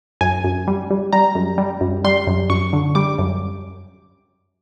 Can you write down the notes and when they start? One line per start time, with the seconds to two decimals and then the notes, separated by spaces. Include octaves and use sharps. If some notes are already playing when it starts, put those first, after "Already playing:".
0.21 F#2 G#5
0.44 F#2
0.67 G3
0.90 G3
1.13 G3 A#5
1.35 F#2
1.58 G3
1.81 F#2
2.04 G3 C6
2.27 F#2
2.50 F#2 C#6
2.73 D3
2.95 G3 D6
3.19 F#2